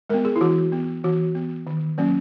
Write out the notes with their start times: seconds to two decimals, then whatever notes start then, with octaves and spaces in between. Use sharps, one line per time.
0.10 G#3 B3 A#4
0.25 G#4
0.36 E4
0.41 E3 F#4
0.72 B3
1.04 E3 F#4
1.35 B3
1.67 D#3
1.98 F#3 A#3 C#4